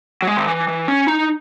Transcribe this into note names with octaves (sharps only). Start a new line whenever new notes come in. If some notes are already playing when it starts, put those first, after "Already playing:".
F#3
G#3
D#3
E3
E3
C#4
D#4